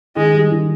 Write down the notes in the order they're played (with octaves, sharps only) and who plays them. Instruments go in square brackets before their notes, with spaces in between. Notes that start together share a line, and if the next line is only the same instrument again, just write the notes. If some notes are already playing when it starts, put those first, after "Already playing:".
[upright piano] D#3 [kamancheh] G#3
[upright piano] G3
D#3